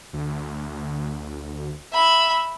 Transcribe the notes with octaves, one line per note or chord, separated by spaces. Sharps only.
D2
E5 B5